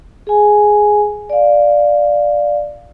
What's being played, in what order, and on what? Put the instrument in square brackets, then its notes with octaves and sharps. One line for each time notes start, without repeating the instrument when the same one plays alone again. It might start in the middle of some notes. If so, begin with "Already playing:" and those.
[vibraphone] G#4 G#5
D5 F5